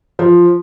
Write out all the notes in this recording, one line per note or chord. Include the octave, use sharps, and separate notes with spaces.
F3